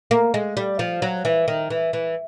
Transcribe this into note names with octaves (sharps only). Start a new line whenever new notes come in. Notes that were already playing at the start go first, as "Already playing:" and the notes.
A#3
G#3
G3
F3
F#3
E3
D#3
E3
E3